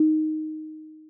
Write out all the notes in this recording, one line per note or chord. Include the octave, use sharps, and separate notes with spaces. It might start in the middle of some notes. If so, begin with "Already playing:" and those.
Already playing: D#4